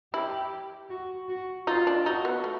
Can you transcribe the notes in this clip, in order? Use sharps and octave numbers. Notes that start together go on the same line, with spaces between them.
E4 G4
F#4
F#4
D#4 F4
D4
D#4 F#4
B3
A3